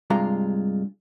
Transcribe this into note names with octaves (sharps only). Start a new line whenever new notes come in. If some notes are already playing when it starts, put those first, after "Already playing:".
G2 C3 G#3 F4 A#5